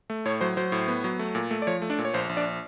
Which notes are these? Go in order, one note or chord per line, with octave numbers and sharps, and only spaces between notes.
A3
A2 C#5
F#3 C5
F#3 C5
A2
B3
F#3
A3
A#2
A3
D5
F3 C#5
A3
D4 D5
A#2
C#5
A#1 C5
A#1
D4 D5